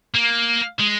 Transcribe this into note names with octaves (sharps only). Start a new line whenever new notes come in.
A#3
G#3